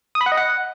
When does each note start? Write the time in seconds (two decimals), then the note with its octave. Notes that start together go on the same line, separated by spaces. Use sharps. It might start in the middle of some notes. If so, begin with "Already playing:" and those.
0.15 D#6
0.21 B5
0.26 F#5
0.32 D#5
0.37 F#5